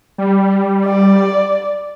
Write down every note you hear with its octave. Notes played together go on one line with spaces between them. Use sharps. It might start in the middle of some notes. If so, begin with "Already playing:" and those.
G3
D5